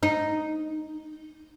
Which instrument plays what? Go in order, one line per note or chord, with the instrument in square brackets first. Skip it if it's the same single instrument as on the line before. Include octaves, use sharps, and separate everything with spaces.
[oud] D#4